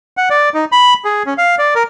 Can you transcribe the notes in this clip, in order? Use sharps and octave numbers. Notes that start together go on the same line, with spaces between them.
F#5
D5
D#4
B5
G#4
C#4
F5
D5
A#4